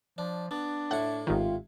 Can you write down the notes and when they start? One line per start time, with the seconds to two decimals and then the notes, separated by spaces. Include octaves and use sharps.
0.18 F3 D4
0.51 B3 D4
0.91 A2 E4 F#5 C#6
1.27 G#1 D#3 F4 G4